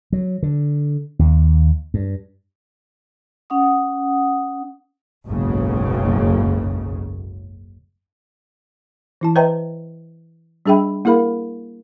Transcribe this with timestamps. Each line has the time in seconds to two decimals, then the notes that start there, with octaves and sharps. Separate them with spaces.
0.13 F#3
0.43 D3
1.19 D#2
1.94 G2
3.50 C#4 F#5 D#6
5.27 F#1 B1 G#2 C#3
9.21 E3 E4 A5
9.36 B4 C5 D#5 E5 G5 A#5
10.66 G3 D4 G#4 E5 G5 B5
11.05 A#3 E4 G#4 A#4 F5 B5